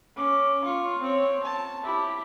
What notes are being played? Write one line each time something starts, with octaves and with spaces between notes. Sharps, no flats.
C#4 D6
F4 C#6
C4 C#5
A5
E4 G4